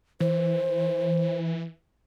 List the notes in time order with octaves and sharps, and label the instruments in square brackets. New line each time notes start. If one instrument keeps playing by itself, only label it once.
[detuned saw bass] E3 [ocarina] C5